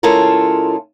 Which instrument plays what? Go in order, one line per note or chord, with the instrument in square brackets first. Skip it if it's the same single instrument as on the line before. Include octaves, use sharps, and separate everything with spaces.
[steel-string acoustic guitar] C#3 G#3 E4 F4 A4 A#4